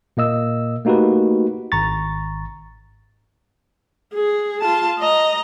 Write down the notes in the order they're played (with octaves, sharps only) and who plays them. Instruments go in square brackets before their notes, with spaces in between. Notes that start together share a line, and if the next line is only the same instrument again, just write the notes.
[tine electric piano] A#2 A#3 D#5 E6
A3 A#3 D#4 F#4 G4 B4
G#1 A#5 C#6 A6
[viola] G#4
F4 A5
D#5 A#5